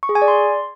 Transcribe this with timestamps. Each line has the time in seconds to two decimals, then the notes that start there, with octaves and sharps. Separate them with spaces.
0.03 C#6
0.09 G#4
0.15 G#5
0.22 D5
0.28 C6